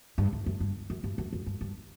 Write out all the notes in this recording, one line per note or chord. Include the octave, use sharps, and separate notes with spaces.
G2
A2
F#2
G2
F#2
G2
F#2
F#2
G2
G2